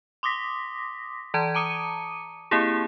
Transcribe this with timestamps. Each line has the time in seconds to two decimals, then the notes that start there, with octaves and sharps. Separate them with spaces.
0.23 C6 D6 D#6 A#6 B6
1.34 E3 D5 A5 A#5 G#6
1.55 A5 A#5 D6 D#6 C#7 D#7
2.51 A#3 C4 E4 G4 G#4